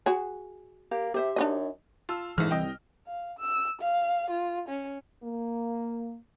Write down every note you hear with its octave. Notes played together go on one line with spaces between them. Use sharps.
F#4 G#4
A#3 G4
C3 G4 C5 E5
F#2 D4 D#4 D#5
F4 A5 E6
A#1 G#2 E3 A3 F6
C2 D#5 G5
F5
E6
F5
F4
C#4
A#3